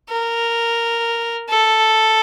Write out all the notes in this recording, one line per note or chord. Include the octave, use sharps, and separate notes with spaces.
A#4
A4